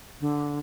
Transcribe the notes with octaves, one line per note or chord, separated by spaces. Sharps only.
D3